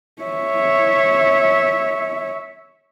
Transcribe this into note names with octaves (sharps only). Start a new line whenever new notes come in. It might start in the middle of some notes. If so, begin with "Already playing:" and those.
C#5 E5